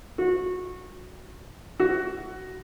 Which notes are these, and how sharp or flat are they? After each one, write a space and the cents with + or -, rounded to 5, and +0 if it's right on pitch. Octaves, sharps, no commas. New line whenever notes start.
F#4 -20
F#4 +15